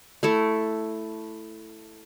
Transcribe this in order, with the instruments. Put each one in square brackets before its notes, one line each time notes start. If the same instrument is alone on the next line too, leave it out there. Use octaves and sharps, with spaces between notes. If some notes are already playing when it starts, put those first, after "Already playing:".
[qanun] A3 E4 A4